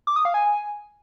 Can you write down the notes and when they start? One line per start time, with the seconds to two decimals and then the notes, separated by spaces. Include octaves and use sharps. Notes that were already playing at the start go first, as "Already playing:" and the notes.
0.07 D6
0.16 D#6
0.25 F5
0.34 G#5